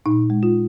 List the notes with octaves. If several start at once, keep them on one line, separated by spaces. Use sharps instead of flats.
A#2 D#4
G#3
F4